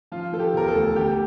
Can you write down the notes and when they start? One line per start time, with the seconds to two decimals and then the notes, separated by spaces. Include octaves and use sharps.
0.12 F3 F4
0.32 F3 A4
0.39 G4
0.53 E1 A#4
0.68 A4
0.74 D2
0.96 D2 G4